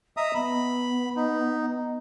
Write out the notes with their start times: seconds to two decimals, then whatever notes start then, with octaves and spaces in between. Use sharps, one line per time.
0.17 D#5 E5 A#5 D#6
0.35 B3 B5
1.16 D#4